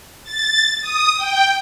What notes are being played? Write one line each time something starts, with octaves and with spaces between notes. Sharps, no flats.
A6
D#6
G5